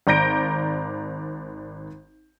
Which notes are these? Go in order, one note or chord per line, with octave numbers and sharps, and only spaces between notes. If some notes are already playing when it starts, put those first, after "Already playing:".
G#1 D5 A#5 G6 A#6 D7